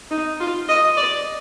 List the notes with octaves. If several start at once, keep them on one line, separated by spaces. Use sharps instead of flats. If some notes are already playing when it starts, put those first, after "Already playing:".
D#4
F4
D#5
D5